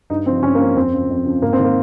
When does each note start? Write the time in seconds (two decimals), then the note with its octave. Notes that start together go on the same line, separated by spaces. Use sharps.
0.10 G2 D#4
0.26 F3 C4
0.43 G2 C#4
0.55 A#3
0.59 F3 C4
0.76 F2 C4
0.92 C#3 F3
1.10 F2
1.26 C#3 F3
1.42 G#2 A#3
1.53 C4
1.59 D#3 A#3